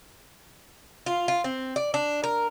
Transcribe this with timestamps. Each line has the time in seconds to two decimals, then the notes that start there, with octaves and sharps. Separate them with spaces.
1.06 F4
1.28 F4
1.44 C4
1.76 D5
1.94 D4
2.24 A#4